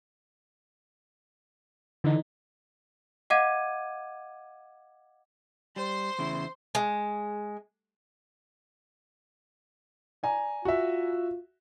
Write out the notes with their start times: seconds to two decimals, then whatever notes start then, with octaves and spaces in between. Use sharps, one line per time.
2.04 D3 E3 D#4
3.30 D#5 F5 F#5 D6 G#6 D#7
5.76 G3 C5 C6
6.19 E2 C#3 E4
6.75 G#3
10.23 D5 G#5 A#5
10.65 F4 F#4 E5